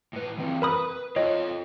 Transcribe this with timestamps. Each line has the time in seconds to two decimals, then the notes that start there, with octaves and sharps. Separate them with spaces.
0.13 A2 B4
0.37 E3 C4
0.62 A#4 B4 B5 D#6
1.16 F4 A4 C#5 D#5